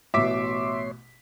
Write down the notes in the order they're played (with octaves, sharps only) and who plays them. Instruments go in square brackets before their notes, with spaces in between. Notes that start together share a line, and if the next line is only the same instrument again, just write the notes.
[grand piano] A1 B2 [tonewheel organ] C#5 C6 [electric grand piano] E5 D6 B6